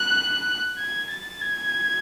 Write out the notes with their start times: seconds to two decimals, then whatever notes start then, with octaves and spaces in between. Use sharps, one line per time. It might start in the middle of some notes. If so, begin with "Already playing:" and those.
Already playing: F#6
0.78 G#6
1.10 A6
1.41 G#6